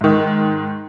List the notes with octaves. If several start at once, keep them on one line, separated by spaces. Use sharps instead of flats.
G#2 D#3